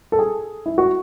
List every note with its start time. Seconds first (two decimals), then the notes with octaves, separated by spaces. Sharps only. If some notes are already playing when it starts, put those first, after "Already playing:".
0.12 A4
0.19 G#4
0.66 E4
0.78 F#4